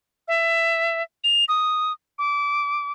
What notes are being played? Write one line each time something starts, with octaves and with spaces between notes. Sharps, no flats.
E5
F7
D#6
D6